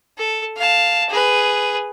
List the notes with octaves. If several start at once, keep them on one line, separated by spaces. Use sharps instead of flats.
A4
F5 A5
G#4 B4